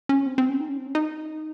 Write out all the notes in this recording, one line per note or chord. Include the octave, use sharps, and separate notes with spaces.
C#4
C4
C4
C#4
D#4
C#4
C4
C#4
D#4